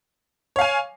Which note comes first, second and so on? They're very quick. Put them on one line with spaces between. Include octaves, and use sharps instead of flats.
C#5 F5 G#5